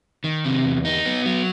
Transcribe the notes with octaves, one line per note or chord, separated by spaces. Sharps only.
D#3
C3
E2
D#4
B3
F#3